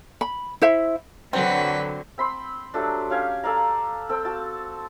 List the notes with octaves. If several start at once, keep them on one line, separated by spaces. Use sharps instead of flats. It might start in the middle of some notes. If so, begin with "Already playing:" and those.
B5
E4 C5 E5
D3 F#3 C4 F#4 B4
C4 B5 C6
F#3 G3 A3 D4
C#4 G4 F5 G#5
A4 D5 F5 A#5
C4 A4 G5
F#4 A5